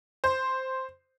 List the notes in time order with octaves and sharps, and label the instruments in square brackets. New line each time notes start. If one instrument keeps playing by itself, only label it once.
[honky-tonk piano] C5